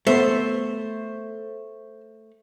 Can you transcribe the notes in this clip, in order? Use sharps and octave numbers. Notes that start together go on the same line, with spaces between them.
A3 B3 C5 E5